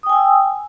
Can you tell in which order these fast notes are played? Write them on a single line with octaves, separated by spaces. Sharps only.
D#6 G5 G#5 E6